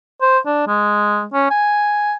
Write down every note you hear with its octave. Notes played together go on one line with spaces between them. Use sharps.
C5
D4
G#3
C#4
G#5